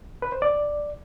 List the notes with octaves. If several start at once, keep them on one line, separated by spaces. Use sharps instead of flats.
B4
C5
D5